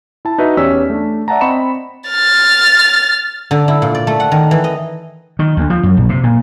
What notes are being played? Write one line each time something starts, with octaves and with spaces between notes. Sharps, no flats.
E4 A5
D#4 F#4 B4 E5
E2 C#4 G4 D5 E6 B6
A3 D4
D5 E5 F#5 A5 A#5
C4 D#5 B5 C#6 C#7 E7
F6 A6
D3
E4
A#2
D5
A3
F#5
D#3
E3
D#5
D#3
D2
F3
F#2
A#1
C3
A#2